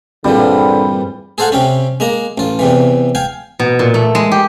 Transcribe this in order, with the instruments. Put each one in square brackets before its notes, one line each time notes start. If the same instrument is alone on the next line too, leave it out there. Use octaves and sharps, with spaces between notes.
[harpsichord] G2 A#2 E3 [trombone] D3 [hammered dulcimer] G3 [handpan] C4 F4 G#4
[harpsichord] G#4 A4 C5 F5 F#5 G#5
C3 C4 C#4
G#3 A#3 A#5
A1 F4
E2 C3 E3
F5 G5 G#5
[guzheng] B2
A#2
A3
G#3
G4